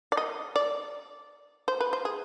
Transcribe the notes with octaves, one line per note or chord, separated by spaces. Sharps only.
D5
D#5
D5
C5
B4
C5
G#4